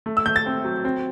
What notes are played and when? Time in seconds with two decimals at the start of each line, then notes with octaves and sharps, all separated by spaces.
0.06 A3
0.17 E6
0.26 A3 G6
0.36 A6
0.46 C4
0.64 F#3
0.85 C4